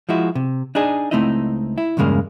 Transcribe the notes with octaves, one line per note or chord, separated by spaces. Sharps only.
F3 G#3 E4 F#4
C3
D4 D#4 G#4
C#2 A3 C4 D#4 E4 D#5
E4
E2 G2 C#3 G#3 A#3